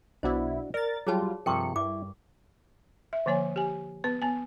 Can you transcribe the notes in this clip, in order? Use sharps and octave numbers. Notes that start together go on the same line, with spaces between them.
B1 B2 D4 E4 F#4 C5 D#5
A#4 D5 A6
F#3 G3 F4 G#4 C#5 A5
G2 C3 F3 A#4 G5 C#6 C#7
G2 E4 D6
E5
D3 F3 A#3 C#5 G#5
G4 G#5
B3 B4
B3 G#5